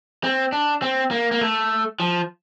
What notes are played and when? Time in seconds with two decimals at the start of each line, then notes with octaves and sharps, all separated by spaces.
0.24 C4
0.52 D4
0.82 C4
1.11 A#3
1.32 A#3
1.41 A3
2.00 F3